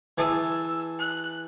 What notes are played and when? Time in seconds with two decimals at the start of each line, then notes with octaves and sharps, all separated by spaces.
0.18 E3 G#4 A5 E6
0.99 F#6